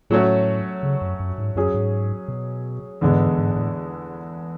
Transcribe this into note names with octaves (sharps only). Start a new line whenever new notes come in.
A2 F#3 A3 C#4 F#4
C#3
F#2
F#2
G#2
F#2 F#3 C#4 G#4
G#2
B2
E2 G#2 D3 G#3 B3
G#2
A2